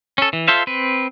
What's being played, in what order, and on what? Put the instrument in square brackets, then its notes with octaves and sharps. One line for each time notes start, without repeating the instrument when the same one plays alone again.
[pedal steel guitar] C#4 A4
E3
F4 A4 C5 E5 F5
C4 B4